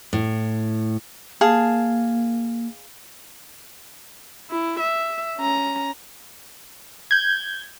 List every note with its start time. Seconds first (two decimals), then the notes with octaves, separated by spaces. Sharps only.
0.13 A2
1.41 A#3 G#4 F5 A5
4.51 E4
4.80 E5
5.38 C#4 A#5
7.11 G6 G#6